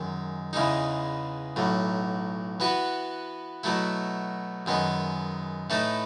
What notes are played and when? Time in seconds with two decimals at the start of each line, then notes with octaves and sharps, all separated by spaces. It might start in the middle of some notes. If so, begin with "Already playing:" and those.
Already playing: F#2 D#3 G#3
0.53 E2 C#3 E3 G#3 D#4
1.56 B1 A2 F#3
2.60 E3 B3 F#4 B4
3.63 B2 F#3 A3 E4
4.66 F#2 D#3 G#3 B3
5.70 A2 E3 A3 D#4 A4